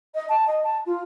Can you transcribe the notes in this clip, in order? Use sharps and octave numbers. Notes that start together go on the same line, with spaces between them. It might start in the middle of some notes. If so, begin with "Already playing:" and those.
D#5
A5
D#5
A5
F4